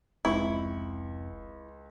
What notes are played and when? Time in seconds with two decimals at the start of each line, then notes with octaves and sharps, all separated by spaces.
0.25 F1 C#2 C4 E4 C#6